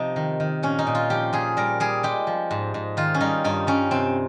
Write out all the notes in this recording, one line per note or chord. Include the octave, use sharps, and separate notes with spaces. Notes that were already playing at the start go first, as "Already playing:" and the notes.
Already playing: C3 F3 D#4
D#3
D#3
A#2 C#4
D#4
A#2
F4
F3 G4
A#2 G#4
G3 A#4
G3 G#4
G#3 G4
F3
G#2
G#2
D#3 F4
C#4
G3 D#4
G2 D#4
G3 C#4
C3 C4